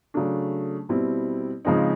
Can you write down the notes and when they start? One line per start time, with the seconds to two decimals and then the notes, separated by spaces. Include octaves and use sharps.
0.14 C#3 F#3 A3 D4
0.89 B2 G3 C4 E4
1.65 C#3 F3 G#3 C4 D#4